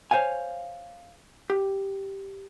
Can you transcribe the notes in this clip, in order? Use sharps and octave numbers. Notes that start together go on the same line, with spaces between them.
C5 C#5 F5 G#5
G4